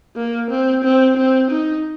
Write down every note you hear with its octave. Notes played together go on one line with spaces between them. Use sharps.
A#3
C4
C4
C4
D#4